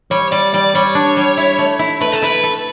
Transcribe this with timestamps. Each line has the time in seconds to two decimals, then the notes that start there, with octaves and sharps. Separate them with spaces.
0.11 G3 C#5
0.32 G3 D5
0.54 G3 D5
0.75 G3 C#5
0.95 D4
1.17 G3
1.37 E4
1.58 A3
1.79 E4
2.00 A3 B4
2.12 A4
2.22 E4 B4
2.43 A4